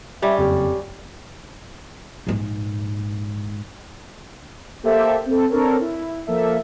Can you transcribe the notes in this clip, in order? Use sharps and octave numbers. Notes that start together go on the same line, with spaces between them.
G3 C#4 E5
F#1 F2 G4
A#1 G#2
A#3 G4 A4 C5 E5
C4 A4
C4 D4 A4 A#4 C#5
E4
F3 A#3 A4 E5